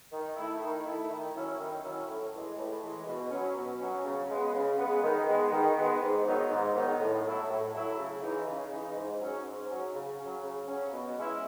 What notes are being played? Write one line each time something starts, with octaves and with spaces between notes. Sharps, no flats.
D#3
A3 E4
D#3
A3 E4
D#3
F#3 C#4 E4
D#3
F#3 C#4 E4
A2
E3 G#3
A2
E3 G#3
B2
F#3 C#4
B2
F#3 C#4
C#3
G#3 B3
C#3
G#3 B3
D#3
G#3 B3
D#3
G#3 B3
G#2
D#3 F#3 B3 D#4
G#2
D#3 F#3 B3 D#4
A2
F#3 A3 E4
A2
F#3 A3 E4
C#3
E3 G#3 D#4
C#3
E3 G#3 D#4
G#2
F#3 C#4
G#2
F#3 C#4
C#3
F#3 C#4
C#3
F#3 C#4
B2
G#3 C#4 E4